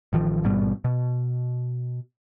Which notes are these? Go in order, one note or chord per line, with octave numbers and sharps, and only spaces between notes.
A1 D#3 F3
A1 G#2 B2 G3
B2